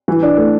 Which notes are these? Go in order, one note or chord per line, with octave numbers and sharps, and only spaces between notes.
E3
D4
A3